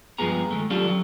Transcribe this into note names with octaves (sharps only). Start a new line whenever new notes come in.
G2 F3 G#3 B3 G#4 A#5
D#3 G#3 A3
F#3 C#4 D4 F4 G4 A4
F#3